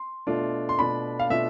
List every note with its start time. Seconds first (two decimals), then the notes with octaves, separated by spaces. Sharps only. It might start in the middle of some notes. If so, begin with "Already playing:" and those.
Already playing: C6
0.27 B2 A3 D4 F4
0.69 C6
0.79 B2 A3 D4 F4 B5
1.19 F5
1.30 B2 A3 D4 F4 E5